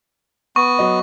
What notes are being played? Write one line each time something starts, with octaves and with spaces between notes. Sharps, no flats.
B3 C#6
F#3 D#5